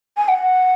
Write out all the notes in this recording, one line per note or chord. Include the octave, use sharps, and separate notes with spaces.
G#5
F#5